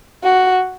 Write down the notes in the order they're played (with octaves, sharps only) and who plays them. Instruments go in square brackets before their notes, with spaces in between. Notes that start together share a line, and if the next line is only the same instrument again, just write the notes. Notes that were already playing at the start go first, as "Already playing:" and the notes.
[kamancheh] F#4